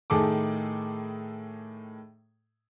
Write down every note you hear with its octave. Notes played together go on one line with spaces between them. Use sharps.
A2 D#3 G#4 A4 D6